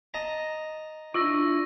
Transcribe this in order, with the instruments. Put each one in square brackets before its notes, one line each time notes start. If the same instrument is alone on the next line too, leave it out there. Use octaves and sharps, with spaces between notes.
[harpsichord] D#5 A5 A#5
[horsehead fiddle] D4 E4 [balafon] F4 [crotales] C#6 E6 A#6